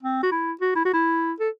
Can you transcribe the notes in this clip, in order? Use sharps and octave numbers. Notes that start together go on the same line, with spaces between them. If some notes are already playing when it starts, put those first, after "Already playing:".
C4
F#4
E4
F#4
E4
F#4
E4
A4